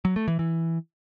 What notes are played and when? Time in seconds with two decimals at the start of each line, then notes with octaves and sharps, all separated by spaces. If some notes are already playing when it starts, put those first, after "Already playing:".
0.05 F#3
0.16 A3
0.28 E3
0.39 E3